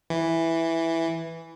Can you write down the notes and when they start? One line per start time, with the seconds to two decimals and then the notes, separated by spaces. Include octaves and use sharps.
0.10 E3